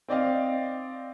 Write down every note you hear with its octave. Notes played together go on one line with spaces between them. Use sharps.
C4 D5 D#5 F5